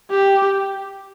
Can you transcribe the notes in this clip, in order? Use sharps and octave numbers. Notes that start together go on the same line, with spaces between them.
G4